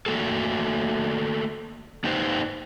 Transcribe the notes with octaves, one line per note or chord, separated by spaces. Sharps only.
A3 A#3 F#4 A4
A#3 D#4 G4 B4 C5